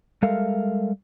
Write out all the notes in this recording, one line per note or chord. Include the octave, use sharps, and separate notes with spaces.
G3 G#3 A4 A#4 E5 F5